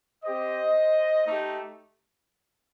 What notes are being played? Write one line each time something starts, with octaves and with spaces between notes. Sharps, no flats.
C4 G4 C5 D#5
A3 D#4 G4